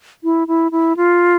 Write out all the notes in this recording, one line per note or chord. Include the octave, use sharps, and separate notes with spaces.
E4
E4
E4
F4